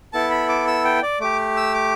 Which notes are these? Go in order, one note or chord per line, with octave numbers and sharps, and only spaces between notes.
B3 E4 A4 A5
B5
D6
E6
G5
D5
A3 G4 D6
E6
D6